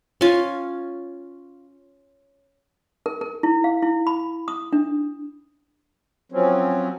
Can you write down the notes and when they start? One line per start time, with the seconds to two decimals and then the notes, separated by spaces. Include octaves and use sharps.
0.21 C#4 F4
3.06 A#4
3.21 A#4
3.43 E4
3.64 F5
3.82 E4
4.07 B5
4.48 D#6
4.73 D4
6.32 F3 F#3 C4 C#4